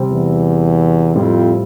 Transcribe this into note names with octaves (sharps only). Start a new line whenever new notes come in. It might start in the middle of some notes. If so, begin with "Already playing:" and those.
Already playing: C3 G3 C4
E2
F2 A2 G3 C4 F4